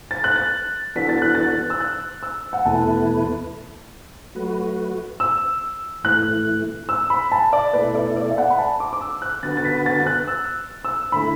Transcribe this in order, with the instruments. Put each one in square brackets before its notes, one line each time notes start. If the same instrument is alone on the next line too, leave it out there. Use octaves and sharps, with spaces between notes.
[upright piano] A6
F#6
A6
[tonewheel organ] E3 B3 D4 F#4 A4 [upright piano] B6
[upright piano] A6
F#6
A6
E6
F#6
E6
F#5
[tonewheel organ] E2 B2 A3 E4 B4 [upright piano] A5
[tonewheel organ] F#3 A3 F#4 B4
[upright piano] E6
[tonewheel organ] A2 E3 A3 [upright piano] F#6
[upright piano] E6
B5
A5
D5
[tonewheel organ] B2 A3 E4 A4 [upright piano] B4
[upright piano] D5
D5
E5
F#5
B5
A5
D6
D6
E6
F#6
[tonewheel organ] D3 B3 F#4 B4 [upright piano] A6
[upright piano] A6
B6
A6
A6
F#6
E6
E6
[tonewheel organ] D3 A3 E4 [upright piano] B5